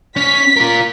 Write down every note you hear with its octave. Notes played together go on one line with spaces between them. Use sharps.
C#4 B6
F4 A#4